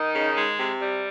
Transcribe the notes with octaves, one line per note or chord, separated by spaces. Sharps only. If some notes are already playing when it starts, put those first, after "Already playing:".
Already playing: D#3 D#4
C#3
G#3
C3
G3